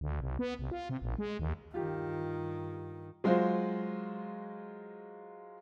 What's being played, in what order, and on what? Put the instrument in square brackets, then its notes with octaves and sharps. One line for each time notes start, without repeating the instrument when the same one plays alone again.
[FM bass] D2
C2
B3
C2
F4
C3
A#1
G#3
D#2
[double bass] G2 D#3 [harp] F4 G4
[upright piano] F#3 G#3 F4 F#4 C5